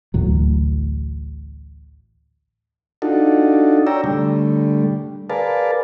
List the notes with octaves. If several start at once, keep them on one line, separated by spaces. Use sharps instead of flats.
A1 D2 A2 F#3
D4 D#4 F4 F#4 A4
C#5 D5 G5 A#5 E6
D3 G3 A3
G#4 A#4 B4 D5 F5 A5